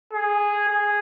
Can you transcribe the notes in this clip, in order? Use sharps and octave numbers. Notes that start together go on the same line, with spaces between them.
G#4
G#4